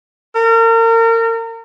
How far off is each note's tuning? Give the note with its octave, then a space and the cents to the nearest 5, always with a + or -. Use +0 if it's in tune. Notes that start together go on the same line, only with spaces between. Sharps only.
A#4 -35